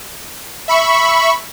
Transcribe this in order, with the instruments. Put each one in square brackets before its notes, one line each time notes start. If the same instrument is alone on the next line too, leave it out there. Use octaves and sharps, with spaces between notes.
[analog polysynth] E5 B5 C#6